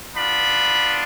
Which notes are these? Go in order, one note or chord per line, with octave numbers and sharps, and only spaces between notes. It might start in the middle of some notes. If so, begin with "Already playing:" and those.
B3 D4 F4 B5